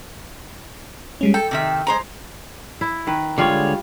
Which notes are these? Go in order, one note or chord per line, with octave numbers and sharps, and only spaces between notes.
G3 G#3 C#4
A4 G5
C3 D#3 E5
G#3 C5 A#5
E4
D#3 B4
D3 G3 G#3 F4 C#5